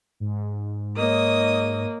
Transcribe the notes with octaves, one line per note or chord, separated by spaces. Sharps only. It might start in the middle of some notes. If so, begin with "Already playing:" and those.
G#2
A#3 C#5 D#5 D#6